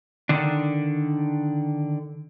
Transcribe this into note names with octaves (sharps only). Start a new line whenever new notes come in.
D3 D#3 D4